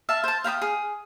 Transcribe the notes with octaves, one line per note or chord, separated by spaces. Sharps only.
E5 F5 A5
C5 A5
F5 G5 B5 D#6
G#4